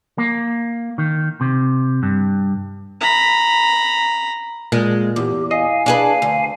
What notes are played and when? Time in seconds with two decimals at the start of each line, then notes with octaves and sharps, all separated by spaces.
0.18 A#3
0.98 D#3
1.41 C3
2.03 G2
3.01 A#5 B5
4.72 A#2 G#3
5.16 E2 G4
5.51 D#5 F5 G#5
5.86 D4 G#4 B4
6.22 D2